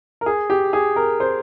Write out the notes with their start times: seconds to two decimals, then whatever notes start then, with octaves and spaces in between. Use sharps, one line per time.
0.21 A#4
0.26 G#4
0.50 G4
0.73 G#4
0.96 A#4
1.20 C5